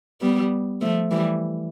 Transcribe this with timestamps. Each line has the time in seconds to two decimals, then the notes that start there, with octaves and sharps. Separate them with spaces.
0.21 G3 B3
0.81 F3 A3
1.11 E3 G3